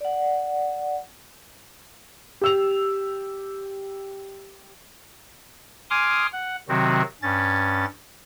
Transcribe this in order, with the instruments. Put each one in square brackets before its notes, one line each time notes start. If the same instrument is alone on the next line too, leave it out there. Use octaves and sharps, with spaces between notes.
[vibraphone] D5 F#5
[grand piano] G4 E6 F7
[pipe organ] G#5 C6 D6 D#6 F6
F#5
C3 D#3 F#3 C4 F#4
G2 C#4 A6